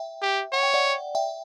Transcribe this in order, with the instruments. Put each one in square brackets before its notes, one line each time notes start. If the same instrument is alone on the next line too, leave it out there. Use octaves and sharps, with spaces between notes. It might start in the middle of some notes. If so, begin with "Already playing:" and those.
Already playing: [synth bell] E5 G5
[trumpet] G4
[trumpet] C#5 [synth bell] F#5
[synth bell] G5
D5 F#5
E5 G5